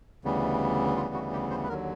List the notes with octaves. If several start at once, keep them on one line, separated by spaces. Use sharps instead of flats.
D2 C#3 E3 G3 B3
F4
F#4
G4
C5
B4
D#2 D3 F#3 A#4